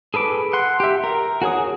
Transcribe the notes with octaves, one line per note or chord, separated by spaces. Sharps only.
G#4 A4 B4 D6
F#5 C6
G4 E5
A#4
F#4 G#4 C#5 D#6